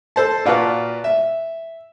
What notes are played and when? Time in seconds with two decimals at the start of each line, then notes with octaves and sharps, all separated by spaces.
0.16 A4 C5 A5
0.46 A#2 F4 F#4 B4 A5
1.04 E5